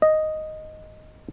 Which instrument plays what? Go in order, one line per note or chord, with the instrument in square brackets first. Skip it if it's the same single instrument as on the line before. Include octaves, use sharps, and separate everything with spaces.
[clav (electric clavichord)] D#5